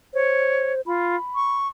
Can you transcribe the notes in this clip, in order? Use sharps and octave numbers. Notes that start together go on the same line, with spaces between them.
C5 C#5
F4 B5
C#6